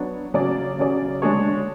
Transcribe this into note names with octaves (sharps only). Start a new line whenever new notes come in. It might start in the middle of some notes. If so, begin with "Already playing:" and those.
Already playing: F#3 B3 D4 F#4 C#5
C#3 F#3 C#4 G#4 D5
C#3 F#3 C#4 G#4 D5
D3 G#3 D4 G#4 C#5